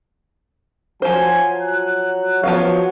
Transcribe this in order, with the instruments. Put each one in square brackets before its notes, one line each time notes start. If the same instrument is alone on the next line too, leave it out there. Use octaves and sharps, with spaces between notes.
[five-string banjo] F3 C5 [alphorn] F#3 [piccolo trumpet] G#5
[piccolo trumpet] F#6
[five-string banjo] F3 B3 F5 [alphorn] F#4 [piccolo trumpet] C#5